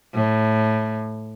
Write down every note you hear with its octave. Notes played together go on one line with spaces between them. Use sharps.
A2